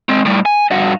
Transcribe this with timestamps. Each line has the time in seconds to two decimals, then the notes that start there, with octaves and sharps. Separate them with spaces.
0.09 G#3 C4
0.25 A2 G3
0.46 G#5
0.71 G2 F#4